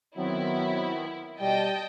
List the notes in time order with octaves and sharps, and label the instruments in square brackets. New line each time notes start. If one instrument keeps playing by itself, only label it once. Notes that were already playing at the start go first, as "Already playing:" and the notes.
[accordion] D#3 B3 C4 [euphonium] F#3 [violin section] E4
[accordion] B2 [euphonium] G3 [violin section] D#5 G5 A5